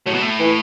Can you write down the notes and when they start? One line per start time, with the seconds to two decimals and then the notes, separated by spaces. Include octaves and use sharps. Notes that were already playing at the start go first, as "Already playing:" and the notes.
0.06 A2 F#3
0.14 B2
0.22 A2
0.40 E3